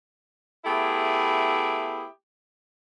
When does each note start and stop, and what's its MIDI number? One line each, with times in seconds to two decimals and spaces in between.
0.65 2.05 57
0.65 2.05 59
0.65 2.05 64
0.65 2.05 67
0.65 2.05 68